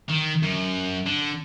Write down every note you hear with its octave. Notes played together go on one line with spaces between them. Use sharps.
D#3
F#2
D3